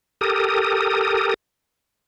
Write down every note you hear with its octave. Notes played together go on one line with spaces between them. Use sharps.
G4 A4 A#4 D#6